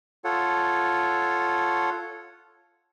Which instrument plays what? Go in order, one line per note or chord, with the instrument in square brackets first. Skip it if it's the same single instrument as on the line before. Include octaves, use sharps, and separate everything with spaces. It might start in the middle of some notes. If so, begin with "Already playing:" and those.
[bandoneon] F4 A4 C#5 F#5